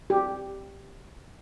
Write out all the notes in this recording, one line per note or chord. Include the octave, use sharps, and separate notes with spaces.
G4